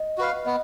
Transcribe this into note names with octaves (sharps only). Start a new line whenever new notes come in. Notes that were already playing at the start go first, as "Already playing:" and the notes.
Already playing: D#5
F#4 B4 F5
B3 D#5